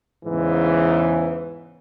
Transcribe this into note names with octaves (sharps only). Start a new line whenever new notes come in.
E2 G#2 C#3 E3